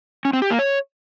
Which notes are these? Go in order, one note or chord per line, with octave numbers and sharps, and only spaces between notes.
C#4
C4
G4
A#3
C#5